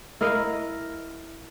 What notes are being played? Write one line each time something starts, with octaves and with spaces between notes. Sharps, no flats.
E4 A#4 D#5 F5